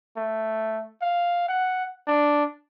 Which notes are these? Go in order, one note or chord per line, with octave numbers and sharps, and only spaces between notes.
A3
F5
F#5
D4